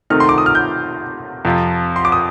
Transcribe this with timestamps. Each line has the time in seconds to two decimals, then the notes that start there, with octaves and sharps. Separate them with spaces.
0.10 C3 D#3 A3 C4 D#4 F6
0.20 C6
0.29 D6
0.38 D#6
0.46 F6
0.55 G6
1.45 F2 C3 F3
1.96 C6
2.05 D6
2.12 D#6